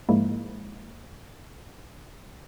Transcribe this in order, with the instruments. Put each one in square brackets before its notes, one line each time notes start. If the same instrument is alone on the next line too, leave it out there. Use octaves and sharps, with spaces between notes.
[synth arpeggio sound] G#2 F3 G#3 A#3 E4